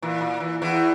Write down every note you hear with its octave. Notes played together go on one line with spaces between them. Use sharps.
A#2 E3
A#2
E3
E2 E3